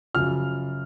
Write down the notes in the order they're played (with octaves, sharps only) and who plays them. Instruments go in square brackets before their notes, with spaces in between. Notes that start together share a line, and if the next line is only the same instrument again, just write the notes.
[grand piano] F#2 C#3 F3 F6